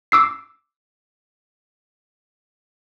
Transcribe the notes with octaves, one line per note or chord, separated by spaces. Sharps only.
D6 E6 C7